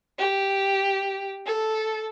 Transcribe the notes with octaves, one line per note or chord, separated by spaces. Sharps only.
G4
A4